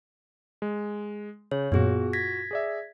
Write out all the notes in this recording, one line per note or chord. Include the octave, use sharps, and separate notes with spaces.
G#3
C#3 C#5
F#2 A#2 B3 F4 F#4 G#4
G#6 A#6 B6
G#4 D5 E5